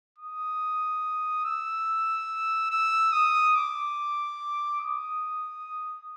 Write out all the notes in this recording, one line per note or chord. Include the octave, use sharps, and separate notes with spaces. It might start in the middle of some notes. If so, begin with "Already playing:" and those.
D#6
E6
E6
D#6
D6
D#6